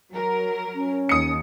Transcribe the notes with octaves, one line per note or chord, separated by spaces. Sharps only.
F#3 A#4
C#4
D#2 D#6 C#7